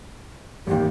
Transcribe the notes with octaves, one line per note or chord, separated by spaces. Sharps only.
A1 D#2 G4